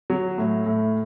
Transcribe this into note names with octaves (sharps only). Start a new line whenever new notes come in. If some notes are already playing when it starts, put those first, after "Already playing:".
F#3
A2
A2